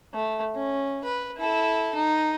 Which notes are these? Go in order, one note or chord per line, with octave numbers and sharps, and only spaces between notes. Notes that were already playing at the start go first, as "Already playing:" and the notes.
A3
C#4
B4
E4 A4
D#4